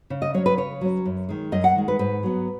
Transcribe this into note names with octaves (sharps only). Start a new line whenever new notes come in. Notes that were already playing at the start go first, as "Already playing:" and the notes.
C#3
D#5
F#3 C#4 C#5
B4
C#3 C#5
F#3 C#4
F#2
D#3 G#3
F#2 D#5
F#5
D#3 G#3
B4
G#2 B4
F#3 B3